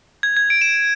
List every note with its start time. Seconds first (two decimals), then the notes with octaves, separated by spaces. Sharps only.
0.23 G#6
0.37 G#6
0.50 D7
0.61 E7